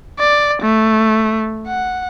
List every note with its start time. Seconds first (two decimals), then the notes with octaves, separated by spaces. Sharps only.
0.19 D5
0.63 A3
1.68 F#5